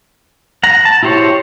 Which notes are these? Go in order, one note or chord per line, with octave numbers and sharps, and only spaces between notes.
F#5 A#5
A5
E4 F#4 G4 C5 C#5